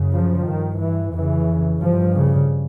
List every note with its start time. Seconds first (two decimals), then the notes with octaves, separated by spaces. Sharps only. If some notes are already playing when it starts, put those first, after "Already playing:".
Already playing: F#2 C#3
0.11 F3
0.45 G2 D#3
0.79 E3
1.13 F2 C#3 E3
1.81 G2 F3
2.14 C#3